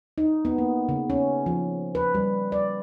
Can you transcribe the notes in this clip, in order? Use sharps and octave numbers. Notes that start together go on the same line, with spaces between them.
D#4
B3
A#3
C#3
C#4
F3
B4
G3
D5